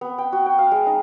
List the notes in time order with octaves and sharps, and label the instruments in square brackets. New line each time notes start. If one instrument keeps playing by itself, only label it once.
[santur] B3
G5
F#4
G5
F5
G#3
D#4